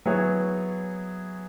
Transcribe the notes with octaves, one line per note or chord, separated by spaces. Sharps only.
F#3 B3 E4 G#4 C#5